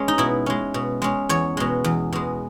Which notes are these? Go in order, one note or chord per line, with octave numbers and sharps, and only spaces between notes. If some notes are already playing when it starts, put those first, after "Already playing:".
Already playing: G#3 C#4
D#4
B2 E4
G#3 C#4
B2
G#3 C#4
E2 C#5
B2 G#3
E2
B2 G#3